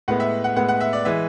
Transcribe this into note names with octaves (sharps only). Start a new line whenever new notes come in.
A2 G#3 B3 F#5
E5
F#5
A2 G#3 B3 F#5
F#5
E5
D5
E3 G#3 E5